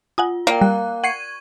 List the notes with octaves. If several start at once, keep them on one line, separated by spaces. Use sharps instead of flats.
F4 F#5 G#5 D#6
A#3 A#4 D5 G5
G3 F#6
F#5 C#6 G#6 C7 C#7 D#7